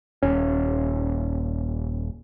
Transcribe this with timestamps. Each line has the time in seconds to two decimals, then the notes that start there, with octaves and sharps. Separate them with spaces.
0.22 D#1 C#4